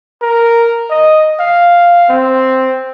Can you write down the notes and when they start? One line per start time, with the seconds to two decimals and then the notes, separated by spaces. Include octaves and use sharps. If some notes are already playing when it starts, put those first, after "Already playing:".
0.22 A#4
0.90 D#5
1.40 F5
2.09 C4